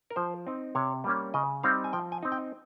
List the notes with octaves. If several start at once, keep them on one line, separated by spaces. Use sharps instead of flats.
A#4
F3 C5
C4 D#4
C3 C#5
G3 A#3 C#4
C#3 D#5
G3 C4 D#4 F5
G#5
F3 G5
G#5
C4 D#4
G5